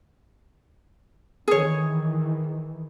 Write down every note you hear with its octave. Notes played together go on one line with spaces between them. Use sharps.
D#3 E3 G#4 C#5